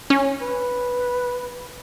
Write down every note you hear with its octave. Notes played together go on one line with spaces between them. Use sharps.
C#4
B4